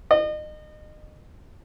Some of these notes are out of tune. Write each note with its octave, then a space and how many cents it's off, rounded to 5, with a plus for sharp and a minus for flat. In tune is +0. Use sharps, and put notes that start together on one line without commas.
D#5 -35